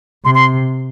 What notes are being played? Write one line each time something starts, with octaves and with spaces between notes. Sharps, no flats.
C3 C6
C6